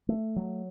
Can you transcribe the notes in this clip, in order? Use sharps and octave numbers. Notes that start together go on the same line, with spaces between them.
A3
F#3